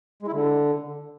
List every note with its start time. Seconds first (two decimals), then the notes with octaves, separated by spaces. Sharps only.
0.23 G#3
0.28 E4
0.33 D3